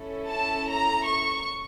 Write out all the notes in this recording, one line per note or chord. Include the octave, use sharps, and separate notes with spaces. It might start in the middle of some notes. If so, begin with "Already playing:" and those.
Already playing: C#4 E4 A4
A5
A#5
C#6